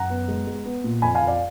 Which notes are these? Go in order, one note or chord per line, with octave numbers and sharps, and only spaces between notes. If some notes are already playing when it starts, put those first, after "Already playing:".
Already playing: F#2 F#5 A#5
B3
G#3
G#3
B3
A#2
F2 G#5 B5
F5 G#5
F2
D5 F5